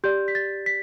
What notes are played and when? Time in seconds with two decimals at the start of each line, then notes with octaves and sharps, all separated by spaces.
0.04 G4 D5 G6
0.28 B6
0.35 A6
0.66 B6